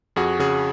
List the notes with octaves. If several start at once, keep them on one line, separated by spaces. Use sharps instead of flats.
F2 F#4 G#4
C#3 F#4 G#4